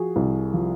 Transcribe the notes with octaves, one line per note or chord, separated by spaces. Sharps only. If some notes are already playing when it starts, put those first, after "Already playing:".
Already playing: F3 F#4 G#4
C2
F3